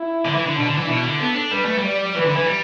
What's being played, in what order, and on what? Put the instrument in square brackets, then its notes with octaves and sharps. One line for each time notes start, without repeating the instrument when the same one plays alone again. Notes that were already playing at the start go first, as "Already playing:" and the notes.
Already playing: [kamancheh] E4
[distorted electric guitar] D3
E3
D3
[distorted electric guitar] B2 [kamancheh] D4
[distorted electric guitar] D3
E3
[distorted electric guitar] B2 [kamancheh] E4
[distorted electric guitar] D3
[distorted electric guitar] B3 [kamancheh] A4
[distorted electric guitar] D4
[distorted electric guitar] G3 [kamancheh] B4
[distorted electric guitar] A3
G3
[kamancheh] D5
[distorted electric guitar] E3 [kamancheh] B4
[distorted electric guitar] D3
E3
G3